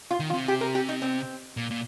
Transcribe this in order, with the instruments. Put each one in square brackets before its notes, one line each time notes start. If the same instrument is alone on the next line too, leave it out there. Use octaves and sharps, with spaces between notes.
[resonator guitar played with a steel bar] F4
[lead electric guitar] D#3
[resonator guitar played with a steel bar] F4
[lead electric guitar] C3
[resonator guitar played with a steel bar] G4
A#4
G4
D#4
C4
[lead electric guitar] A#2
A#2